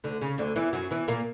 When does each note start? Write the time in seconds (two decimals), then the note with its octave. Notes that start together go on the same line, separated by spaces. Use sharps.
0.04 D2 D3
0.22 C#3
0.38 D2 D3
0.56 E2 E3
0.73 F#2 F#3
0.91 E2 E3
1.08 A#2 A#3